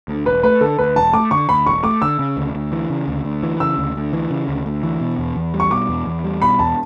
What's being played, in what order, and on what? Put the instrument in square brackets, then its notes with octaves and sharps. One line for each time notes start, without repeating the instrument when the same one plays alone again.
[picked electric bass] D2
[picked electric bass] E1 [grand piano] B4
[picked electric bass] A3 [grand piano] B4
[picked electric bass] D3 [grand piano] A4
[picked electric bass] D2 [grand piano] B4
[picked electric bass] E1 [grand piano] A5
[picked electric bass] A3 [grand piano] D6
[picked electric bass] D3 [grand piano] C#6
[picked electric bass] D2 [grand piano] B5
[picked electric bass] E1 [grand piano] C#6
[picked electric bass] A3 [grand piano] D6
[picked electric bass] D3 [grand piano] E6
[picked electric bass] C#3
D2
D2
E3
C#3
D2
D2
E3
[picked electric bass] C#3 [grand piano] E6
[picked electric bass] D2
D2
E3
C#3
D2
D2
E3
B2
E2
E2
G3
[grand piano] C#6
[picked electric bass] B2 [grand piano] D6
[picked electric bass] E2
E2
G3
[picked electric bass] B2 [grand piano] B5
[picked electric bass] E2 [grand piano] A5